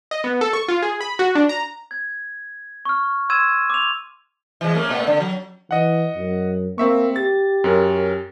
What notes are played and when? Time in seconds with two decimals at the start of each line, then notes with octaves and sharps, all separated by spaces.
0.11 D#5
0.24 B3
0.41 A4
0.53 C#6
0.68 F4
0.82 G#4
1.01 B5
1.19 F#4
1.35 D4
1.49 A#5
1.91 G#6
2.85 C#6 F6
3.30 C6 E6 G#6 D#7 E7
3.70 D6 F7
4.61 E3 F3 G#3
4.74 A3 A#3 C#4
4.90 A#2 A3 B3
5.07 D3
5.20 F#3
5.71 E3 D#5 F#5
6.15 F#2
6.78 A#3 C4 E5 C#6
7.16 G4 A6
7.64 F#2 C#4 A#4